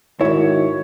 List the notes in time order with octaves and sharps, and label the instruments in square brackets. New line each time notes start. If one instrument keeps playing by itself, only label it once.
[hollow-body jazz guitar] G#2 E4 [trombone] D#3 [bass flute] F#4 [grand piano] C#5